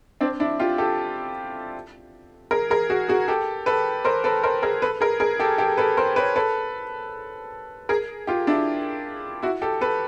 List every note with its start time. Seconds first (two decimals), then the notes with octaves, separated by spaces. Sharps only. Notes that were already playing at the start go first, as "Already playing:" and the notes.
0.21 C4 D4
0.40 D4 E4
0.60 F4 G4
0.78 G4 A4
2.51 G#4 A#4
2.70 G#4 A#4
2.90 F#4 G#4
3.08 F#4 G#4
3.28 G4 A4
3.66 A4 B4
4.05 A#4 C5
4.24 A4 B4
4.44 A#4 C5
4.63 G#4 A#4
4.82 A4 B4
5.01 G#4 A#4
5.20 G#4 A#4
5.39 G4 A4
5.58 G4 A4
5.77 A4 B4
5.97 A#4 C5
6.16 B4 C#5
6.36 A4 B4
7.89 G#4 A#4
8.27 F4 G4
8.47 D4 E4
9.42 E4 F#4
9.62 G4 A4
9.81 A4 B4